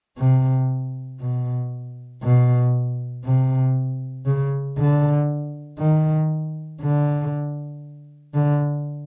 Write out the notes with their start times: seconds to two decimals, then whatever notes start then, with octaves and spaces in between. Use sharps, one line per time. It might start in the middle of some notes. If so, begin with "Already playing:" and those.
0.18 C3
1.20 B2
2.23 B2
3.25 C3
4.26 C#3
4.77 D3
5.79 D#3
6.81 D3
8.34 D3